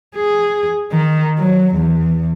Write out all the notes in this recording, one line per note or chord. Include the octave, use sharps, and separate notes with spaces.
G#4
D#3
F#3
E2